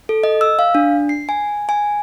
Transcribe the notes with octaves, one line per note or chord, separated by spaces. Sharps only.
A4
D#5
E6
F5
D4
C7
G#5
G#5